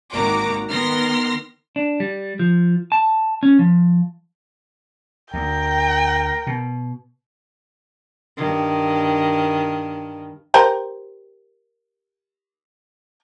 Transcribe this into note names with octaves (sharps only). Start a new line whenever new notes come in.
G#1 D#3 A#3 F#4 A#5 D6
D#3 B3 A#4 C6 F6 A#6
D4
G3
F3
A5
C#4
F3
D2 A#4 G5
B2
G2 D#3
G4 A#4 C5